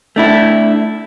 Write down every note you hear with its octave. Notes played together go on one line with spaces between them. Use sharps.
A3 D4 E4